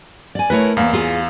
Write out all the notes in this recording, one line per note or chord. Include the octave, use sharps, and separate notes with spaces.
D5 G#5
A3 E4 A#4 B4 C#5
E2 A#3 E4 F5
F4 G#4